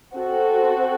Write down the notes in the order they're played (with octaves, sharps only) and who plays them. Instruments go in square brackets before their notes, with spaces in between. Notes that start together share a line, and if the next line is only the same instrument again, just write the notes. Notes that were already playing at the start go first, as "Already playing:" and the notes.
[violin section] C4 F#4 A4